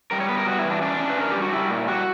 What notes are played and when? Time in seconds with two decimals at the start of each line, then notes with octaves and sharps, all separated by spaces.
0.11 G3 A#4
0.20 C#5
0.29 B3 B4
0.38 A#4
0.47 G3 F#4
0.58 E4
0.64 E3
0.70 D4
0.82 C#4 D4
1.00 C#4
1.10 B4
1.17 C#4 A#4
1.31 G3 G4
1.42 F#4
1.52 G3 E4
1.70 A#2
1.88 G3 F#4